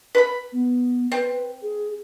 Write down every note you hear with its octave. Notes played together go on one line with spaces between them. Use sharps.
B4 B5
B3
C4 B4
G#4